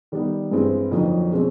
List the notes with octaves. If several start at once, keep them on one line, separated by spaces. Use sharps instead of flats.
D#3 G3 B3
G2 E3 G#3 C4
F2 D3 F#3 A#3 D#4
B2 G#3 C4